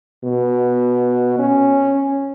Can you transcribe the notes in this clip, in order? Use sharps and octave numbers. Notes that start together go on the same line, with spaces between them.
B2
C#4